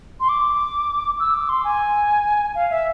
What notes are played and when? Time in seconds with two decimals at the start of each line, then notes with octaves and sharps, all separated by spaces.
0.20 C6
0.29 D6
1.20 E6
1.34 D6
1.49 C6
1.64 G#5
2.55 F5
2.70 E5